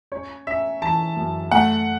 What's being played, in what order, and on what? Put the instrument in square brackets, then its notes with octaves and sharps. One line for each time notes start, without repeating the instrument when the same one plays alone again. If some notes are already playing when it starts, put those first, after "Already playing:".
[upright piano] C#4 C#5
C#4 E5
E3 A5
F#2
A3 F#5